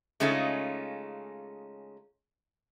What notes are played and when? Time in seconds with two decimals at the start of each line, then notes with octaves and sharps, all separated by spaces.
0.20 C#3 G#3 A3 C#4 D#4 F4